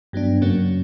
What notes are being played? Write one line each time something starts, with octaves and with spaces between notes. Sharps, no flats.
G2 F#3 B3 D4
F#2 C#3 F#3 A#3 C#4